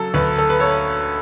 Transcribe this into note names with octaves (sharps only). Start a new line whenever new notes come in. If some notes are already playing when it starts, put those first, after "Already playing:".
Already playing: C#3 F#3 A4
D2 B4
A4
B4
A4 C#5